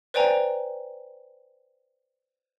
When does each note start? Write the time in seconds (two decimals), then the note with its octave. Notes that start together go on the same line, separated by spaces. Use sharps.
0.14 B4 C5 D5 G5 G#5 A#5